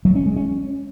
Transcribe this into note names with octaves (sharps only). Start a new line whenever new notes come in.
F#3
C#4
G#3
C#4